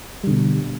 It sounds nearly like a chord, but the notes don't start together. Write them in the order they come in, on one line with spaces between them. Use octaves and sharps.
G3 D3 B2